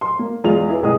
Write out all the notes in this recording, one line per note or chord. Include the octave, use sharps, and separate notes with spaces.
C6
A#3
E2 G#3 F4 F7
E4 G#4 B4
C2 A2 G#3 G#4 D#5 D#6